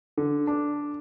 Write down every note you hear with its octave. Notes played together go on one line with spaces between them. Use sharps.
D3
D4